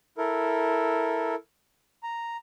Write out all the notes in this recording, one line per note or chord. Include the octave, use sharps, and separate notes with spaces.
E4 A4 A#4
A#5